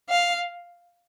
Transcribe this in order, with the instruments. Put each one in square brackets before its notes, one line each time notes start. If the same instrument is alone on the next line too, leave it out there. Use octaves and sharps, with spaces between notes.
[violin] F5